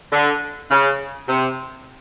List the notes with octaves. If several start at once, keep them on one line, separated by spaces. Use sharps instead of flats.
D3
C#3
C3